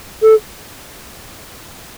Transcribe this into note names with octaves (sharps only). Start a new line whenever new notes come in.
A4